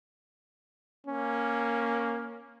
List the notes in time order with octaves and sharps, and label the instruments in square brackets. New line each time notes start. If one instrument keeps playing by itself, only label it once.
[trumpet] A#3 [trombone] C#4